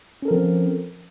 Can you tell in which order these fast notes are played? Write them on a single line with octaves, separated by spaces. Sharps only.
C#4 A4 A#4 F3 C4